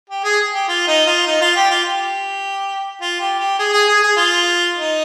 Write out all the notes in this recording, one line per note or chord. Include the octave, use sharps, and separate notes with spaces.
G4
G#4
G4
F4
D#4
F4
D#4
F4
G4
F4
G4
F4
G4
G4
G#4
G#4
G#4
G#4
F4
D#4